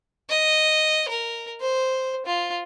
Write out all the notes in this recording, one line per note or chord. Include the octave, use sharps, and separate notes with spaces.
D#5
A#4
C5
F4